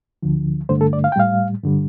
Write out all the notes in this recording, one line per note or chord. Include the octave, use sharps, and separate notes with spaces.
D2 D3 F3
G2 D3 A3 C5
A4
D5
F5
G5
A2 G3 F5
G2 D3 G3